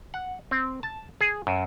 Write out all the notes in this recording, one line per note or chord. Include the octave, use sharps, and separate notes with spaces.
F#5
C4
A5
G#4
F#2